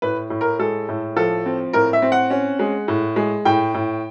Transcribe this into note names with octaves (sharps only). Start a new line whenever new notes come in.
A2 B4
A2
A#4
G#3 A4
A2
F3 A4
C4
A2 A#4
E5
C4
F#5
C#4
G#3
A2
G#3
A2 G5
A2